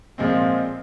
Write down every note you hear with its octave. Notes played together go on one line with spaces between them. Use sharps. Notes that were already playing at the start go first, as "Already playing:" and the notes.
A#2 F3 G#3 C4